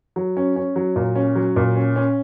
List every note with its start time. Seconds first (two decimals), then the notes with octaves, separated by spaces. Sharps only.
0.16 F#3
0.37 C#4
0.56 C#4
0.76 F#3
0.96 A#2
1.16 C#4
1.35 F#3
1.56 A#2
1.76 C#4
1.96 C#4